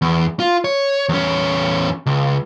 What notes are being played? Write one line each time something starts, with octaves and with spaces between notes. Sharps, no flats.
E2
F4
C#5
E2 C#4
C#2